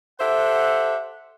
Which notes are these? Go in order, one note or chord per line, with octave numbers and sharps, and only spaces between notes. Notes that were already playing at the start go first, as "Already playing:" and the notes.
G4 A4 C5 E5 F#5